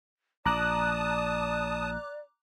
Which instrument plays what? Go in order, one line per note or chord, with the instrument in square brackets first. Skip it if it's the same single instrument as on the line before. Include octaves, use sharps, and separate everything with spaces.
[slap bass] A#1 [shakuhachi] D5 [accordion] A5 D#6 [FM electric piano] A#5 D6 F#6